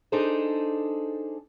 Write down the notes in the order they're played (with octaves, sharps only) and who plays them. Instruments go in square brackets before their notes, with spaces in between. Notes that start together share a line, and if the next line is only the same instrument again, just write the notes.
[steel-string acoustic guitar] D4 D#4 G#4 A4 C5